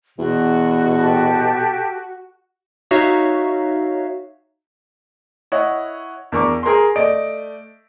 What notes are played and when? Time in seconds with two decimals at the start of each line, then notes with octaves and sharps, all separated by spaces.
0.18 E2 B2 F#4
0.99 G4 A4 A5
2.91 D#4 F#4 C#5 E5 F5
5.52 E4 C#5 D#5 F#5
6.32 E2 D4 A#4 C#6 D6
6.63 G#4 A#4 A#5 C6
6.96 A3 D5 D#5 D7